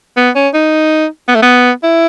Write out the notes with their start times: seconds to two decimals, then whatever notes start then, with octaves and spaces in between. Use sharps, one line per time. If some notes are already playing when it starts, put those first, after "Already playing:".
0.17 B3
0.35 C#4
0.54 D#4
1.28 B3
1.35 A3
1.42 B3
1.83 E4